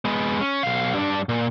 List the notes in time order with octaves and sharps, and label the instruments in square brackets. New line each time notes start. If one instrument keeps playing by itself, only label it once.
[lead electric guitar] G#3 B3
C#4
B1 F5
G2 D4
A#2